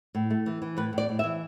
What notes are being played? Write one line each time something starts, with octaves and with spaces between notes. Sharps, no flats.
A2
A3
E3
E3
A2 B4
A2
D5
A2
E5
E3